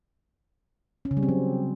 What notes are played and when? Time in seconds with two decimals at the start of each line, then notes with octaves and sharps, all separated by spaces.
1.05 C#4
1.11 C#3
1.17 G3
1.23 C4
1.29 F#3